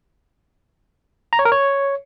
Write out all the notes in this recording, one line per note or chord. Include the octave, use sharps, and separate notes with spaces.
A#5
C#5
A#4
C#5